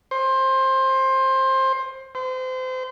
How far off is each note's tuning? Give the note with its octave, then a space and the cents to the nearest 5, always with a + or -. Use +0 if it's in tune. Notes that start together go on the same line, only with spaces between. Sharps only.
C5 +20
C5 -30